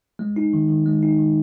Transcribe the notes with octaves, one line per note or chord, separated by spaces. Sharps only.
G#3
D#4
D#3
D#3
G#3
D#4
D#3